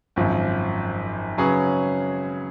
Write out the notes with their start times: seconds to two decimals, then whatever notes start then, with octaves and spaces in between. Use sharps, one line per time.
0.16 G#1 F#2 F3
1.38 C#3 F#3 C#4 G#4 B4